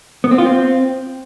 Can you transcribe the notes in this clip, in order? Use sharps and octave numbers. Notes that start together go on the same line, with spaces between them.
B3
C4
F4
C4